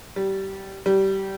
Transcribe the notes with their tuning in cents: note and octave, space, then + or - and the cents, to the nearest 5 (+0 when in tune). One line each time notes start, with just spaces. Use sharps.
G3 -20
G3 -20